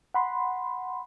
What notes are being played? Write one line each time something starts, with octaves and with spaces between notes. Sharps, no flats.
F#5 B5 C6